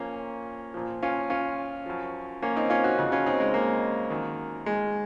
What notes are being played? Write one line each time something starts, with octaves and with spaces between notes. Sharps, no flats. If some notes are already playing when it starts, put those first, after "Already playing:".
Already playing: A#2 F3 A#3 C#4
A#2 F3
C#4 F4
C#4 F4
F#2 F3
A#3 C#4
C4 D#4
C#4 F4
D#4 F#4
F2 C#3 F3 D#4 F#4
C#4 F4
C4 D#4
G#3
A#3
F#2 D#3
G#3